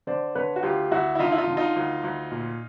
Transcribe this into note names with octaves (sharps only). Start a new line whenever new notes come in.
D3 C5 D5
D3 B4 C#5
F#4
D2 F4 G4
D2 E4 F#4
E4
D3 D#4 F4
E4
D#4 F4
D3
D#4 F4
D2
D2
A#2